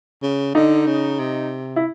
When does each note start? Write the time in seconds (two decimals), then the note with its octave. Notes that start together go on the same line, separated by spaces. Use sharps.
0.23 C#3
0.54 D3 D#4
0.87 C#3
1.19 C3
1.76 E4